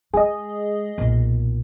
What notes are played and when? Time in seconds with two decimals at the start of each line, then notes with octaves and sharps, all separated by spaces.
0.14 G#3 G#4 D#5
0.98 B1 A#2